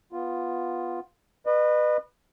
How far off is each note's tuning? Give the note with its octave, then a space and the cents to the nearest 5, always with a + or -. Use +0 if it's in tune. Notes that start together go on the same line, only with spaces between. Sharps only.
B3 +0 F4 +0
B4 +0 D#5 -40